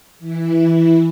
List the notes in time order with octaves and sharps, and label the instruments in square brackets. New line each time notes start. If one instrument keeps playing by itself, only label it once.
[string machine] E3 E4